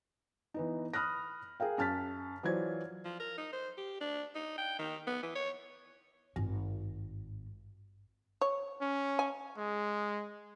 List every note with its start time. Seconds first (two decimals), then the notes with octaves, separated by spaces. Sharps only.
0.54 E3 B3 D#4
0.94 B5 D#6 F6 F#6 A#6
1.60 G#4 A#4 F5 G5
1.78 F#2 A5 F6 A6 B6
2.43 E3 F#3 F4 C5 D5 G#6
3.05 F3
3.20 A#4
3.38 D#4
3.52 C5
3.77 G4
4.00 D4
4.35 D#4
4.58 G5
4.79 D#3
5.07 B3
5.23 E3
5.35 C#5
6.36 G#1 G2 F4
8.41 C#5
8.81 C#4
9.19 G#5
9.58 G#3